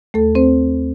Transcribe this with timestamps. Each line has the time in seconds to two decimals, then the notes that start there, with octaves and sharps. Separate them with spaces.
0.14 D#2 A3 A4
0.35 C4 C5